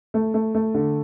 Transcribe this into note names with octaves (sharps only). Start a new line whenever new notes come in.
A3
A3
A3
D3